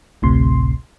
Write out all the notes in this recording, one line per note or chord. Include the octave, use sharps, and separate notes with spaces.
A1 D2 A2 C3 C6